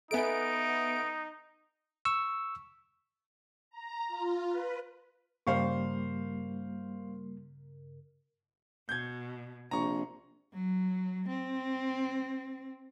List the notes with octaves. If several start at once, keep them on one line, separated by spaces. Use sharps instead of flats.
B3 D#4 A4 E5 G#5 D7
C#6 E6
A#5
F4
B4
G2 C#3 G3 A#3 A#4 C5 F5 C#6
B2 G6 G#6
A#1 C3 A#5 C#6
F#3
C4